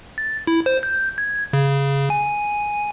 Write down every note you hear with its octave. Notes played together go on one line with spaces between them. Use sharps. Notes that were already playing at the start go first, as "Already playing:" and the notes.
A6
E4
C5
G6
G#6
C#3
G#5